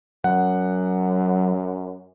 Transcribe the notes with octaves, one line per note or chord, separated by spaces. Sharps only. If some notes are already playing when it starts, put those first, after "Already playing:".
F#2 F#3 F#5